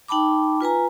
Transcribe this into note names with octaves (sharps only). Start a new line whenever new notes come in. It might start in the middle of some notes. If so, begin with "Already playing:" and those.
D#4 G5 A5 B5 D6
F4 B4 G#5 A#5